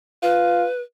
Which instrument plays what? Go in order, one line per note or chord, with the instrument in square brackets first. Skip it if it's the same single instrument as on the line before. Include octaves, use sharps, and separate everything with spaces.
[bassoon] F4 [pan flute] B4